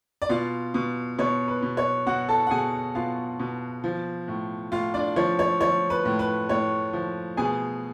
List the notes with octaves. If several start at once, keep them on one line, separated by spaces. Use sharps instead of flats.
D5
B2 F4 F5
B2
B2 C#5
B4
B2
C#5
B2 F#4 F#5
A4 A5
F#5
B2 G#4 G#5
B2 F4 F5
B2
F3
A2
A2 F4 F5
D4 D5
F3 C#5
C#5
F3 C#5
B4
A2
B4
A2 C#5
F3
B2 G#4 G#5